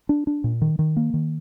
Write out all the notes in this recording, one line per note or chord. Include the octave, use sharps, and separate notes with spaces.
D4
D4
A#2
D#3
D#3
A#3
D#3